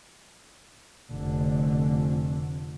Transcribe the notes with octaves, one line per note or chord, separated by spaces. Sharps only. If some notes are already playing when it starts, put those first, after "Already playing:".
F1 D3